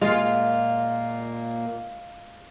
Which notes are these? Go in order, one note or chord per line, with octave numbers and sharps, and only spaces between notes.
A#2 G#3 A#3 F4